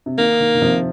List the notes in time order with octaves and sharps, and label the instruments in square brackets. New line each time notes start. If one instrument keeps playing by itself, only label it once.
[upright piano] C3
[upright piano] D#3 [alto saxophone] A#3
[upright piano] D#3
D#3
C3 F3